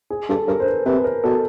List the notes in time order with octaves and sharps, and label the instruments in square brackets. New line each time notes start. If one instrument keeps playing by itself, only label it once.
[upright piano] G#4
[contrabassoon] G2 [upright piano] A4
[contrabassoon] G2 [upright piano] A#4
[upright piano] C5
B4
[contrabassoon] C3 [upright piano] B4
[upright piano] A#4
[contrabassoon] B2 [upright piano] A4